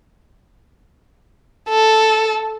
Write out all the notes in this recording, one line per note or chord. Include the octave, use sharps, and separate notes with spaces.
A4